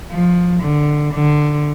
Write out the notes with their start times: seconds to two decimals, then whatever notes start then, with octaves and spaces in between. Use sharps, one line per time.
0.11 F3
0.62 D3
1.13 D3